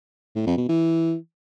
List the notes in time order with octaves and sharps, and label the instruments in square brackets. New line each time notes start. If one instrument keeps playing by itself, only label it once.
[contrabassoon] A2
F2
B2
E3